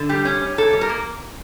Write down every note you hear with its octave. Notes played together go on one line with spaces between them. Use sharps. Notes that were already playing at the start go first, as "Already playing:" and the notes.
Already playing: D3
G3 G4
C#4
C#4
A#2 A4
G3
A#4
A#3